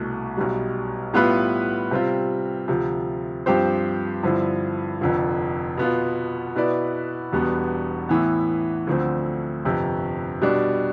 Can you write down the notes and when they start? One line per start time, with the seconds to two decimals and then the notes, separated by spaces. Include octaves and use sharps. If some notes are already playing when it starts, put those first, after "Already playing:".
Already playing: C2 B2 A3
0.37 B1 B2 G3
1.14 A2 G3 B3 F4 B4
1.91 C3 G3 C4 F4
2.68 D2 C3 F3
3.46 G2 F3 C4 G4 C5
4.23 G2 D3 F3 C4 E4
5.01 F1 F2 D3 F3
5.77 B2 B3 F4
6.55 B2 B3 E4 B4 D5
7.33 E1 E2 B2 G3 B3
8.09 A2 E3 B3
8.87 D2 D3 F3 A3 C4
9.65 G1 F2 C3
10.42 B2 G3 D4